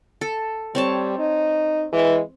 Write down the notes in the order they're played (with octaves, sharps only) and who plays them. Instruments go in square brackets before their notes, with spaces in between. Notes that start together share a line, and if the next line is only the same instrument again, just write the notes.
[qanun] A4
[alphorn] G3 [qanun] C4 C#5 A5
[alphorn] D#4
[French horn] E3 [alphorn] G#3